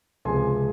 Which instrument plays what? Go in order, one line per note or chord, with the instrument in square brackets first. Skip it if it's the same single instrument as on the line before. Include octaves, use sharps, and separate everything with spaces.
[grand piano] C#2 C3 F3 G#3 G#5 C6